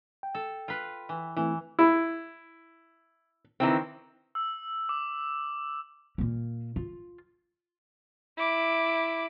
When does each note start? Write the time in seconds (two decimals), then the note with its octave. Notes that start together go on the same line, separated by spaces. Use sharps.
0.23 G5
0.35 A4
0.68 F4 B4
1.09 E3
1.37 E3 A3 C4 E4
1.79 E4
3.60 D#3 E3 C4
4.35 E6
4.89 D6
6.18 A#2 A#3
6.76 F4
8.37 E4 D6